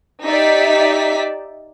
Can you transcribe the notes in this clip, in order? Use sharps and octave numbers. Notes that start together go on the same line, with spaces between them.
D#4 G4 D5 E5 B6